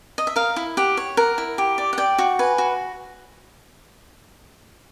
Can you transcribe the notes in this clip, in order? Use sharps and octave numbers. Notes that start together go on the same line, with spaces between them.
D#5
E5
A#4 F5
E4
G4 F#5
C#5
A#4 F#5
E4
G4
D5
F#5
D5 G5
F#4
B4 G#5
F#4